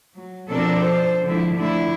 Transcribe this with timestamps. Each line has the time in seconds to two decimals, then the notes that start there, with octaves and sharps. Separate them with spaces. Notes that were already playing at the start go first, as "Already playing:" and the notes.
0.15 F#3
0.50 B2 F3 C4 D4 A4 A#4
0.82 A4 C5
1.24 D3 F3 G#3 E4
1.56 D3 F3 A3 E4